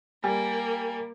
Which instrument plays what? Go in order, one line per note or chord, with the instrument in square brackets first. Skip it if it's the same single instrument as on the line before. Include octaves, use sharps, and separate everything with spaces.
[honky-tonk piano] G3 [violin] A#3 [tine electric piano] G#5